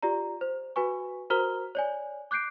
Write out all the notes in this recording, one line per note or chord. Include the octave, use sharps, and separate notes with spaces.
F4 G4 D5 A#5
C5
F#4 B4 G#5 C#6
F#4 A#4 C5 A#5 F6 G7
C#5 D5 G#5
D6 F#6 G6 C7 D7